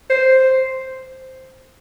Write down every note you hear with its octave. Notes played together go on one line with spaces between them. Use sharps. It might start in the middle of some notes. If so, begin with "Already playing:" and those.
C5